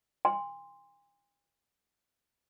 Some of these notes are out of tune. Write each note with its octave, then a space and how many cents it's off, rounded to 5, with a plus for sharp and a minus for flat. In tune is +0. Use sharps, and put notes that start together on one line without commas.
G#5 -45 C6 +0